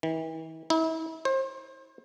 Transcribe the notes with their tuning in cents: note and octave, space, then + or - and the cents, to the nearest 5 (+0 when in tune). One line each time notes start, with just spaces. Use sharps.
E3 -40
E4 -35
C5 +30